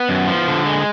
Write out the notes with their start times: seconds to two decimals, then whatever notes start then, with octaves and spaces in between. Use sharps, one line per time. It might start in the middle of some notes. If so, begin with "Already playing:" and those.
Already playing: B3
0.09 F#2
0.28 F3
0.48 D3
0.66 G#3